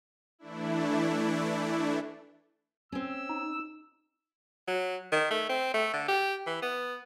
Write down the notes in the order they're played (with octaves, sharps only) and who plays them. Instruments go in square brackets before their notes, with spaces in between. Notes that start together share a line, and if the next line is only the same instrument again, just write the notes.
[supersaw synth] E3 A3 D4 E4
[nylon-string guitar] C4 C#4 [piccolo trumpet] E6
[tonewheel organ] D#4
[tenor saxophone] F#3
D#3
A3
C4
A3
D3
G4
E3
B3